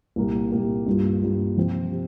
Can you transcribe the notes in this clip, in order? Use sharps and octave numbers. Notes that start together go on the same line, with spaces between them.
C2 A#2 A#3 G4 A#4
C2 A#2 A#3 G4 A#4
G2 G3 A#3 F4
G2 G3 A#3 F4
C3 F3 C4
C3